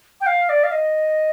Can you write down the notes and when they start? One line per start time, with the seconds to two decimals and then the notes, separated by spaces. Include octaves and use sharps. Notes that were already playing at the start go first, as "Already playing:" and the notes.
0.21 G5
0.26 F5
0.49 D5
0.64 F5
0.72 D#5